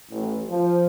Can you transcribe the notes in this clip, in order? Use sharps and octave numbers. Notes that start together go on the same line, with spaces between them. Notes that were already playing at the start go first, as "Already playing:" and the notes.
A1
F3